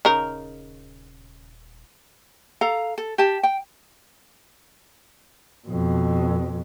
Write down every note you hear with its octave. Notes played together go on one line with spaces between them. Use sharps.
D#1 C#3 D#4 A#4
A4 F5 A#5
A4
G4 A5
G5
F2 B2